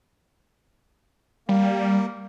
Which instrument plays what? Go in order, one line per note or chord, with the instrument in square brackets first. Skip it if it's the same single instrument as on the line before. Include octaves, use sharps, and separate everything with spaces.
[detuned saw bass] G3 [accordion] A#3